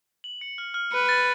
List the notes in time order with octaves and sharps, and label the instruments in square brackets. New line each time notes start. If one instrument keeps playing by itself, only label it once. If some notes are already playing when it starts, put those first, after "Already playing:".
[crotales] F#7
C#7
F6
F6
[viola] B4 [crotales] C#7
[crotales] A6